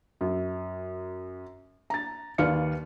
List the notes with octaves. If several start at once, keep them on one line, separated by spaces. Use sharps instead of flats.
F#2
A#5 A6
D#2 B4 D5 F5 F6 C#7